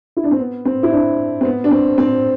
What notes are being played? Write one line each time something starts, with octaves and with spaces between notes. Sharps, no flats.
E4
D4
C4
B3
C4
E4
D4
C4
B3
D4
C4
C4